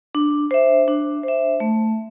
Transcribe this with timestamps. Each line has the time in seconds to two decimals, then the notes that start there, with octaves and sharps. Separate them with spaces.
0.15 D4
0.51 C5 E5
0.88 D4
1.23 C5 E5
1.60 A3